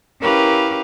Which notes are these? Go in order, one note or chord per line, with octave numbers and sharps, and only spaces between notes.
C#4 E4 G4 A#4 B4 F5